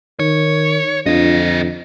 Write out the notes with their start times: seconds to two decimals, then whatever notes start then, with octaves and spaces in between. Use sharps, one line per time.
0.20 D#3 C#5
1.06 F2 D3 D4 F4 D#5